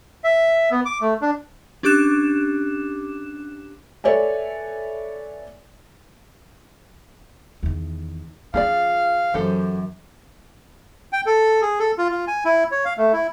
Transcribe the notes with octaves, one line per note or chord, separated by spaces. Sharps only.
E5
B3
D6
A3
D4
C#4 D4 G4 D6 F#6 E7
A4 B4 C#5 D5 E5 G#5
E2 D#3
F3 C#4 F4 G#4 D5 F5
F#2 E3 G4 A4 C5
G5
A4
G#4
A4
F4
F4
G#5
E4
C#5
F5
A3
E4